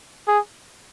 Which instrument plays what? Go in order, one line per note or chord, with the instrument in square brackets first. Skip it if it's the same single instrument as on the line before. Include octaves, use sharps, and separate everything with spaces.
[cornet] G#4